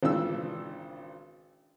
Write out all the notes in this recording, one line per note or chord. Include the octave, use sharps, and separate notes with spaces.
G#1 A#2 C#3 E3 D4 E6